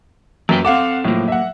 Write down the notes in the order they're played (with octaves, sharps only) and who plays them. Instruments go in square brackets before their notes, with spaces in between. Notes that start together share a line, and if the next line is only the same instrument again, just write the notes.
[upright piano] F#2 [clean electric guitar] A#3 B4 G5
[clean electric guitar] C4 A4 [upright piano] F5 F#5 D6
[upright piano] A2 F3 [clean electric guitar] F#3 A#3
[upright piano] E5 F#5